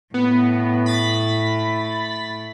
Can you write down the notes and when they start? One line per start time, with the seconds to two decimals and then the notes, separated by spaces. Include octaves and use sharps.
0.14 A2 B3
0.86 B5 A6 B6